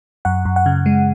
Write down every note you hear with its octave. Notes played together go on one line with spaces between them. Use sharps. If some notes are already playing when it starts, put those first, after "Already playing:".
F#2 F#5
F#2
F#5
C#3
G#3